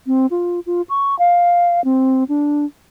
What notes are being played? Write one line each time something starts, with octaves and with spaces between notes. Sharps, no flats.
C4
F4
F4
C#6
F5
C4
D4